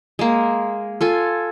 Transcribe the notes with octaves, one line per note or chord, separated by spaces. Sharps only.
G#3 A#3
F4 A4 G#5